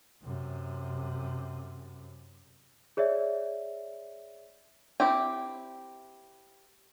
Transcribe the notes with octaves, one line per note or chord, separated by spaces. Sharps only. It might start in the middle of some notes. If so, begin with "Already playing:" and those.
F#2 C3
G#4 C#5 D5 E5
C4 E4 G4 G5